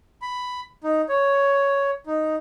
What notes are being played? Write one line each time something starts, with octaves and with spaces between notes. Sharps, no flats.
B5
D#4
C#5
D#4